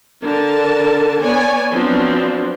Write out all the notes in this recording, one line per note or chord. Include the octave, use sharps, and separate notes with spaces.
D3 A#4 A5
B3 C#5 D5 G#5
F3 F#3 B3 C4 D4